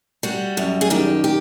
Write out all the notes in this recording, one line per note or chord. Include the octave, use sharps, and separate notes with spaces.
G3 F#4
F#2
G#4
D#3 G4
G4